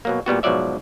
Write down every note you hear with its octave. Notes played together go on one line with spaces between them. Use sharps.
B2 F#3 A#3
A#2 G3 B3 F#4
G#2 B2 F3 F#3 D5 E5